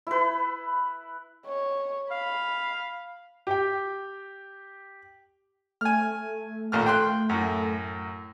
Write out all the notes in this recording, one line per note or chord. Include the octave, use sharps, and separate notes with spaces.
E4 B4
C#5
F5 B5
G4 G5
A3 G#5 F6
A#1 D#2 F6
G5 C6 F#6
F#2 A2